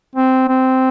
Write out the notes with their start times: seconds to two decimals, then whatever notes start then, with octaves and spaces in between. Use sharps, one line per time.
0.15 C4
0.48 C4